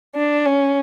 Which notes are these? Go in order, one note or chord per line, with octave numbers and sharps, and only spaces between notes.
D4
C#4